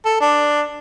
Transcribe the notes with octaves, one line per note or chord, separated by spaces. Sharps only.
A4
D4